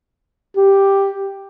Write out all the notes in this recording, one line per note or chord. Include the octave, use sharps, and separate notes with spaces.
G4